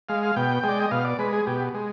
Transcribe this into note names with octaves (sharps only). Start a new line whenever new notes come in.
G#3 F5
F5
B2 G5
G#3 D5
D#5
B2 F5
D5
G#3 B4
G#4
B2 G4
G#3